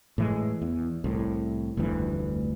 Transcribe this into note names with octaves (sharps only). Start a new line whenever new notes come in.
A2 E3 G#3
E2
C2 A2
F1 D2 G2 E3